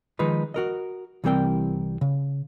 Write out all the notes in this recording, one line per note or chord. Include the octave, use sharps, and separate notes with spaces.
D#3 F3 G#3 D#4 B4
F#4 A#4 D#5
C2 E3 G3 C4 A#4 G5
C#3